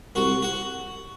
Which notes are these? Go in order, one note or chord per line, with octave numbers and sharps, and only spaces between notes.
C2 F#4
F#4